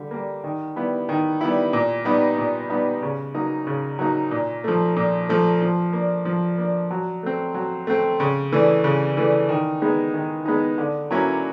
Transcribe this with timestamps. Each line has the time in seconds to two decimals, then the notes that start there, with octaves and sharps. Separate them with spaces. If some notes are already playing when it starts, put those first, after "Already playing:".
Already playing: D3 G3
0.11 G3 A#3
0.44 D#3
0.76 G3 B3 E4
1.09 D#3
1.41 G3 B3 E4
1.73 A#2
2.05 G3 B3 D#4
2.38 A#2
2.70 G3 B3 D#4
3.02 C#3
3.34 F#3 A#3 D#4
3.67 C#3
3.99 F#3 A#3 D#4
4.31 A#2
4.64 F3 A3
4.96 A#2
5.29 F3 A3
5.62 F3
5.93 A#3 D4
6.25 F3
6.58 A#3 D4
6.91 F#3
7.23 A3 C4
7.54 F#3
7.87 A3 C4
8.20 C#3
8.53 E3 A3 D4
8.84 C#3
9.17 E3 A3 D4
9.49 D#3
9.82 G#3 B3 D#4
10.14 D#3
10.45 G#3 B3 D#4
10.78 D3
11.11 F#3 A#3 C#4 E4